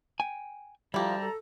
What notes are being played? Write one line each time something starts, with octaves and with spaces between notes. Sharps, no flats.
G5 G#5
D2 F3 G3 E4 G4 A5 A#5
A4